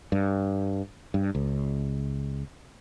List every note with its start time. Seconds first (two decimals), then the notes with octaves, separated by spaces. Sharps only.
0.12 G2
1.14 G2
1.35 C#2